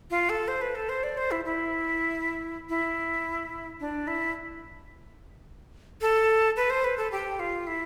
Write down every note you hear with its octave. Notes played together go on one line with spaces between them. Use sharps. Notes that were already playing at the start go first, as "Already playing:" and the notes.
F4
A4
C5
B4
A4
C5
D5
C5
E4
E4
E4
D4
E4
A4
B4
C5
B4
A4
G4
F4
E4